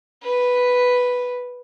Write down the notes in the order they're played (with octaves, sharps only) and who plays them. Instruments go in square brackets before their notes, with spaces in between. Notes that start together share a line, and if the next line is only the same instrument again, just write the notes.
[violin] B4